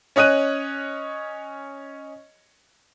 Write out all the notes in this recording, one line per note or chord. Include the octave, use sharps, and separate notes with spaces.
C#4 C#5 D#5 F#6 D#7